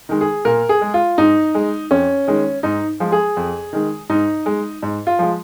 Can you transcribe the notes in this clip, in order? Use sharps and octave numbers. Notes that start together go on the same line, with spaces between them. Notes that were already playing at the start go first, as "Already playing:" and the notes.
D#3 G#3
G#4
A#2 A#4
G#4
G#3
F4
G#2 D#4
G#3
F2 C#4
D#3 G#3
G#2 D#4
F3 G#3
G#4
F2
D#3 G#3
G#2 D#4
G#3
G#2
F4
F3 G#3